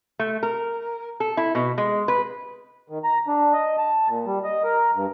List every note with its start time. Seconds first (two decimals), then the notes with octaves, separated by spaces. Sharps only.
0.19 A3
0.43 A#4
1.20 A4
1.37 E4
1.55 B2
1.78 G#3
2.08 B4
2.90 D#3
3.04 A#5
3.27 D4
3.53 D#5
3.78 A5
4.08 A#2
4.26 G3
4.44 D#5
4.64 A#4
4.95 G2